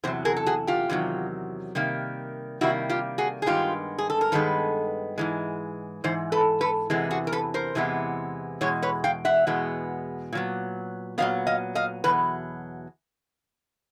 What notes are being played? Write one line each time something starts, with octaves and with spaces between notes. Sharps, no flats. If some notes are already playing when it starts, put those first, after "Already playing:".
E2 C3 F#3 C5
G#4 A#4
A4
F#4 G#4
F4 G4
E2 C3 D#3 F#3
C3 D#3 G3 A#3
C3 D#3 G3 A#3 E4 F#4
F4 G4
F#4 G#4
G#4
G2 D#3 G#3 B3 F4 G4
G#4
A4
A#4
G2 D#3 G#3 B3 A4 B4
G#2 E3 G#3
G#2 E3 C5
A4 B4
A4 B4
E2 C3 E3 G#3 B3
F#4 G#4
A#4
A4 B4
A#4 C5
E2 C3 E3 G#3 B3
E2 B2 G#3 C#5
B4 C#5
F5 G5
E5 F#5
E2 B2 G#3 B3
A#2 F#3 B3
A#2 F#3 B3 D#5 F5
D#5 F5
D#5 F5
E2 B2 F#3 B4